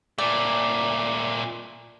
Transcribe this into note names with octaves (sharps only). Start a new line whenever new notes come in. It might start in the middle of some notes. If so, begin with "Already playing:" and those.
A#2 A3 D5